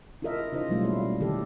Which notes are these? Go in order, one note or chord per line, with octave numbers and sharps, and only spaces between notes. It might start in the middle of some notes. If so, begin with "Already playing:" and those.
E4 F4 A4 A#4 D#5 E5
C#3 D#4 F4 C5 D#5
B2 F#3 G3 A3 F4
A#3 C#4 E4 F5
D3 D#3 G4 A4